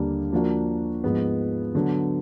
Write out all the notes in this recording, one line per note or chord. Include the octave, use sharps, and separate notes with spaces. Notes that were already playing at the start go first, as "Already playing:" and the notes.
Already playing: D#2 D3 G3 A#3 D4
F3 A#3 D4 F#4 A#4
G#2 F3 G#3 B3
D3 F#3 B3